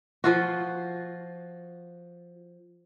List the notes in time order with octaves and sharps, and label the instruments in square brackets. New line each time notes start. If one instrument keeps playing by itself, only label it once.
[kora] F3 F4 F#4